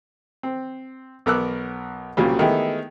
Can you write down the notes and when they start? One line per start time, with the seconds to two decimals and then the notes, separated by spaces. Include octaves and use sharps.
0.43 C4
1.26 B1 B3 A#4 D6 E6 F#6
2.17 C2 A#2 C#3 F#3 G3
2.39 D#3 G#3 A3 B3 E4 G4